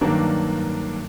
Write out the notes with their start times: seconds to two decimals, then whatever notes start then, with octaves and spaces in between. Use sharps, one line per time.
0.01 G2 D#3 F#3 A#3 D4